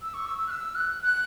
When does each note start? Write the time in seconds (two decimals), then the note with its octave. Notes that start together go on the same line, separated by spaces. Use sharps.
0.01 E6
0.13 C#6
0.26 E6
0.38 E6
0.46 F#6
0.50 E6
0.75 F#6
1.03 F#6